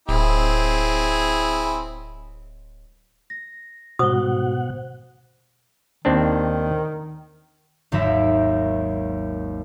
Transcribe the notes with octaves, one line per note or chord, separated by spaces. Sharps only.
D1 C4 E4 G#4
A#6
G#2 B2 F#4 C5 F#5 D#6 G7
D#2 D#3 C4 D4
G#1 D#2 F#3 A#4 E5